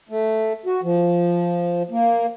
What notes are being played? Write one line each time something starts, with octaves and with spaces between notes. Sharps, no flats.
A3
F#4
F3
A#3